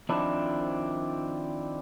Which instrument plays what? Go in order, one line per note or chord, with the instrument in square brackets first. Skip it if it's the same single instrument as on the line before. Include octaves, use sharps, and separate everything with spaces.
[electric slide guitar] D#3 F3 C4 D4 E4